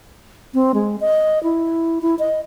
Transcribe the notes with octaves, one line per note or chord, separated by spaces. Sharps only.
C4
G#3
D#5
E4
E4
D#5